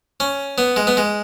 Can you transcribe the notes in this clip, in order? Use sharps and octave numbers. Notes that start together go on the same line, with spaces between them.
C#4
B3
G#3
B3
G#3